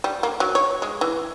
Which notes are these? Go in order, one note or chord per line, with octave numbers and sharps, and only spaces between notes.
G3
A#3
F#3
C#5
G#3
E3